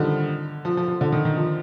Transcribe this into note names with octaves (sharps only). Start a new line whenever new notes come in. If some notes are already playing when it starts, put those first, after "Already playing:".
Already playing: D3 D#3 F3 G3
F3
F3
F3
D3
D#3
D#3
F3